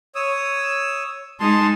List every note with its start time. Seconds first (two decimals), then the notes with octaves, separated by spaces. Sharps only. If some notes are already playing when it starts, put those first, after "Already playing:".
0.15 C#5 D#6 E6
1.40 G#3 D#4 G#4 A5 C6